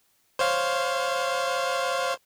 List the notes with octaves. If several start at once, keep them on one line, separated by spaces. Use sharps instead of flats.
C5 C#5 F5